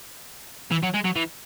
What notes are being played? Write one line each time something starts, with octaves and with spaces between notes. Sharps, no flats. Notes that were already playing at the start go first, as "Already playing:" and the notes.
E3
F#3
G#3
F#3
E3